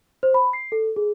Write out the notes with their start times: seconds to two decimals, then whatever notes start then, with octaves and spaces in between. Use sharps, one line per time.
0.23 C5
0.34 B5
0.53 C7
0.72 A4
0.96 G#4